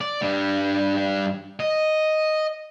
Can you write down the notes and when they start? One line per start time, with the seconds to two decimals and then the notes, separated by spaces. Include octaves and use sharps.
0.01 D5
0.22 G2 G3
1.60 D#5